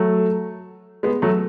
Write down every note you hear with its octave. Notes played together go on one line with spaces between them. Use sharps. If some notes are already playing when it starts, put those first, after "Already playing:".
Already playing: F#3 A3
G#3 B3
F#3 A3